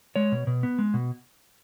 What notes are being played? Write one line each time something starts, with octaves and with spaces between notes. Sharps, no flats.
G#3 C#5
B2
B2
B3
G#3
B2